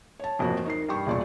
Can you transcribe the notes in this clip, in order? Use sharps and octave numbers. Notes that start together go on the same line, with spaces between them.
C#5 A5
A1 F2 A#3 F#4
D#4 A#4 C7
G2 G5 C#6
E1 A#2 D5 F5 C#6